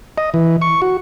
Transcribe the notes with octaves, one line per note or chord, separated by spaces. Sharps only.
D#5
E3
C#6
F#4